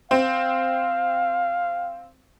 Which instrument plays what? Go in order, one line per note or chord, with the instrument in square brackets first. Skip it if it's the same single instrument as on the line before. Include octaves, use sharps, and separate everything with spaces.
[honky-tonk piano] C4 [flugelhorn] F5